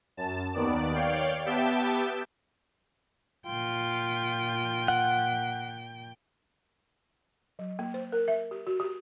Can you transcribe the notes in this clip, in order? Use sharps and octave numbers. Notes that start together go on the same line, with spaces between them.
F#2 A5
D#2 D#3 B3 D5
C#5 D5 F5 G5
B3 G4 E5 G5 A5
A#2 F4 G5
F#5
F#3
A#3
C5
A#4
E5
G4
F#4
G4